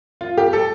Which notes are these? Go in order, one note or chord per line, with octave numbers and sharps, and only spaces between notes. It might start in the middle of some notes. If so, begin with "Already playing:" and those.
F4
G4
A4